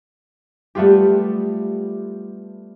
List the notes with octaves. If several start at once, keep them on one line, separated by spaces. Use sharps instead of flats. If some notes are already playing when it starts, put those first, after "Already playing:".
G3 A3 B3 F4 G4